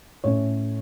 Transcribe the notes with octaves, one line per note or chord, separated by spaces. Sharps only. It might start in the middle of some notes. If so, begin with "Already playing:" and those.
A2 A3 C#4 C#5